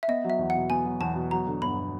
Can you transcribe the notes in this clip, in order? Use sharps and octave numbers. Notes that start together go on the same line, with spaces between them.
E5
B3 D#5
F#3
E5
E2
F#5
B2
B3 G#5
F#3
E2 A5
B2
F#3 A#5
D3
G1 B5